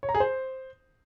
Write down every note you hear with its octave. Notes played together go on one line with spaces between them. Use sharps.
C#5
A#5
G#4
C5